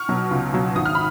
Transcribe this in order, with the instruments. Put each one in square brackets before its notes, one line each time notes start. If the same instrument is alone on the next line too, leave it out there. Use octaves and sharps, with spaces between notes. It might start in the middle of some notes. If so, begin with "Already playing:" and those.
Already playing: [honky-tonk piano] C#6 F6
B2 F#3
C#2
B2 F#3
G#1 D#6
F6
B5